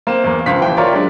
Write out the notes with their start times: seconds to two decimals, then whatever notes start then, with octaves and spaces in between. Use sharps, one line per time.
0.07 A#3 C4 E7
0.24 E2 A#3
0.46 C#2 F3 F5 B6
0.61 D#1 E3 G5
0.77 F4 A#4 C#5 D5
0.93 F#3 G#3 D4